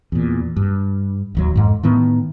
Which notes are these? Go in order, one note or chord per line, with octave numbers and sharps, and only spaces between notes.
E2 A#2
G2
D1 D#2 F#3
F2 G#2
A2 D#3 B3